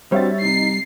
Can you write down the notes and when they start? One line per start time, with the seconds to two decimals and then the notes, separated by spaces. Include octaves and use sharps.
0.12 G3 C4 D4 F#4 C#5 E5 A6
0.42 C3 D#4 C7